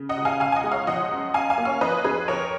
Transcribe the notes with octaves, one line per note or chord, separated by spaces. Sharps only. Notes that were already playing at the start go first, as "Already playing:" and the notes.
Already playing: C#3
D#5 F#5
C#2
F5 G#5
C#2 F5 G#5
G#5
D#5 F#5
G#3
C#5 F5
F3 D#5 F#5
F#2
F#2 F5 G#5
F5 G#5
A#3
C#5 F5
F3 B4 D#5
F2 G#4 B4
F2 A#4 C#5